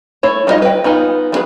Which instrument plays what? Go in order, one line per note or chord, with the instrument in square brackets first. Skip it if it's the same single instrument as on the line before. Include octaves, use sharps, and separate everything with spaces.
[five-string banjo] A3 E4 C#5
G3 D4 D#4 F4 D#5
B4 G5
B3 D#4 F4 G#5
G3 B3 G#4 B4